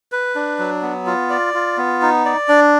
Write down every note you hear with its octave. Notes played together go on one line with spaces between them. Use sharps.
B4
D4
F#3
B3
F4
D5
F4
B3
D#4
D5
D4